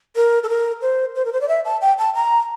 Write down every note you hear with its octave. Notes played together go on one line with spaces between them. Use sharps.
A#4
A4
A#4
C5
C5
A#4
C5
D5
E5
A5
G5
A5
A#5